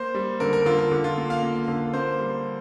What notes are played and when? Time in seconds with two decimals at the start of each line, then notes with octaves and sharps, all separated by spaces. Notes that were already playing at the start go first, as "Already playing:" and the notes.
Already playing: A#3 C5
0.15 G3
0.40 D3 A#4
0.53 A#4
0.66 D3 F4
0.79 A#4
0.92 D3
1.04 F4
1.18 A#3
1.30 F5
1.43 A#3
1.68 D3
1.94 A#3 C5
2.20 G3